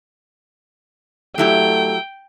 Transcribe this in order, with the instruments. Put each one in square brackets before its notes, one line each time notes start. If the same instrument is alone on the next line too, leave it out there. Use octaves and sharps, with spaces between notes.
[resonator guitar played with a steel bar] F#3 E4 G4 [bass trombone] A3 [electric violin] G5